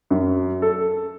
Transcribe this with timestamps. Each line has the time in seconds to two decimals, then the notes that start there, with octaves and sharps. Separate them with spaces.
0.10 F#2
0.62 A4